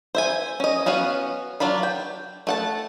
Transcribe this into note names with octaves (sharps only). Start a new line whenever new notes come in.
C5 E5 G#5
C#4 D#5
B3 C#4 F#4 F5
F#3 D4 F4 B5
G5
A3 F#5 A5